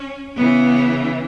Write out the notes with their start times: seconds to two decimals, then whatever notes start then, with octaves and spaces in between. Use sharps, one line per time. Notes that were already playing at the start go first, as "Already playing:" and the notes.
Already playing: C#4
0.37 C#3 E3 B3